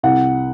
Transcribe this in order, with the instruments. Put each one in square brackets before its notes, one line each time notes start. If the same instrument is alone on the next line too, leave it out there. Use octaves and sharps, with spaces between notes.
[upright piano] C2 F#5